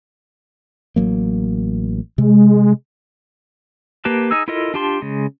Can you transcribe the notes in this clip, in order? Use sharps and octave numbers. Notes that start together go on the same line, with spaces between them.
A1 F#3 A#3
C3 G#3
A#3 G4 B4 A5
D#4 G#4 E6
E4 F4 A4 A#4 D#5
D4 F4 G4 A5 C6
C#3 G#3